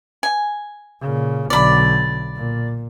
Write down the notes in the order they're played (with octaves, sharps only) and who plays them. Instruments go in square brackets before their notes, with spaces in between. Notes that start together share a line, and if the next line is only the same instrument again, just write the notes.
[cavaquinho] G#5
[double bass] A#2 C#3
[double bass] B1 D3 [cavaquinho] D5 B5
[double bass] A#2